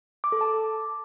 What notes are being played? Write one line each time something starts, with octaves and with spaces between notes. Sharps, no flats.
D6
A4
A5